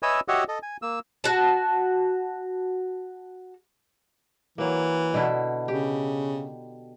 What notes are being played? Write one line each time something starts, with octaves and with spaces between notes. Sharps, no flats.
B4 C#5 D#5 E5 G#5 E6
F#4 G4 C#5 D#5 E5 F#5
A4 D#5
G#5
A#3 E6
F#4 A5
E3 F#3 A#3
B2 D3 E4
C#3 G4